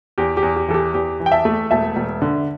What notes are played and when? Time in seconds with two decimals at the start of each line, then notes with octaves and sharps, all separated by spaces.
0.18 E2 G4
0.37 G4
0.43 E2
0.56 G4
0.68 E3 A4
0.74 G4
0.94 E2 G4
1.20 E3
1.26 G5
1.32 E5 A5
1.45 A3
1.71 E1 E5 A5
1.96 E1
2.22 D3